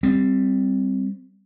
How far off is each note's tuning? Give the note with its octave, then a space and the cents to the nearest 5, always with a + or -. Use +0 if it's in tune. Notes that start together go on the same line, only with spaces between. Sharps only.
G3 +0 C4 +0